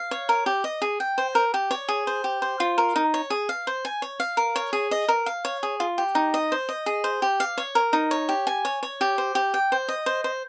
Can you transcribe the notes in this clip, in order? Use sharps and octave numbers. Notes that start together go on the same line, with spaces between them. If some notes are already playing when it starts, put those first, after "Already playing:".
Already playing: F5
C#5
A#4
G4
D#5
G#4
G5
C5
A#4
G4
C#5
G#4
C5
G4
C5
F4
A#4
D#4
C#5
G#4
F5
C5
G#5
C#5
F5
A#4
C#5
G#4
D#5
A#4
F5
C#5
G#4
F4
G4
D#4
D#5
C5
D#5
G#4
C5
G4
F5
C#5
A#4
D#4
C#5
G4
G#5
C#5
C#5
G4
C5
G4
G5
C5
D#5
C5
C5